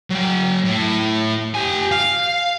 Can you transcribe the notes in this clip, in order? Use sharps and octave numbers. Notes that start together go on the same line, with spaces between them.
F#3 G5
A2
G4 G#5
F5